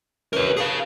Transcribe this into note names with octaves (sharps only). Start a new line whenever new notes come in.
C#2 E3 C#4 A#4 C#5
F#4 G#4 F5 A5 C#6